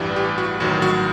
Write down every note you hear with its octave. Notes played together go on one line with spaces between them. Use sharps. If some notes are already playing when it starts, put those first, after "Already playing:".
Already playing: A1 G2 E3 G3
G4
F#4
A1 G2 D#3 F#3 F#4
F#4